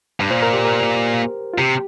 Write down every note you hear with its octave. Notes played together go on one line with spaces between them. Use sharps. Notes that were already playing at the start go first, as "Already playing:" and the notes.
G2
A#2 C5
A#4
G4
A#4
F4
C3 G4